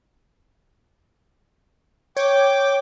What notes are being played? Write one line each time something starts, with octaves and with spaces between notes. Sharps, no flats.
C#5 G5 D6